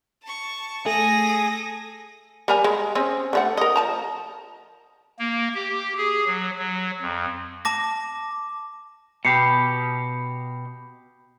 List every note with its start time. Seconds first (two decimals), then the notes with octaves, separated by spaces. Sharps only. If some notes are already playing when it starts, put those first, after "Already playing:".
0.22 A5 C#6
0.86 A3 G#4 A4 D#6 A#6
2.48 G3 A#4 G#5
2.64 G#3
2.95 C4 C#4 G#4
3.33 D3 A3 F#5
3.57 A#4 D#5
3.76 F3 A5 A#5
5.19 A#3
5.54 G4
5.98 G#4
6.27 F#3
6.59 F#3
7.02 F2
7.65 A5 D6 A#6
9.25 B2 G4 B5 C7 C#7